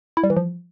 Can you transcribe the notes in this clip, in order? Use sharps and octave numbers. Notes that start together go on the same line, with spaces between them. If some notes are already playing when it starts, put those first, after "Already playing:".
E4
G3
E3
F3